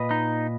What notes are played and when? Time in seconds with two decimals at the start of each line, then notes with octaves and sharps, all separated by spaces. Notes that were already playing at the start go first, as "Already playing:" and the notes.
Already playing: A#2 B4 D#5
0.11 D#4